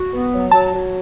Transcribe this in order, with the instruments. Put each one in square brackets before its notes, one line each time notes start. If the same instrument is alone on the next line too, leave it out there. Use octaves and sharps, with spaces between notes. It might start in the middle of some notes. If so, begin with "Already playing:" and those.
Already playing: [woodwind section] F#4
B3
F#3
[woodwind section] F#3 [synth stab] A5
[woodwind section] F#3